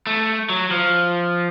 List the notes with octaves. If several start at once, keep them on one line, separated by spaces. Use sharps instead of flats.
A3
F#3
F3